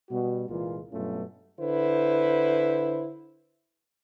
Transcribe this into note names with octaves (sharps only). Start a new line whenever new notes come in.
B2 G3 F#4
C2 A#2 E3 G#3 A#3 F4
G2 B2 F#3 A3 C#4 F4
D3 E4 B4 C5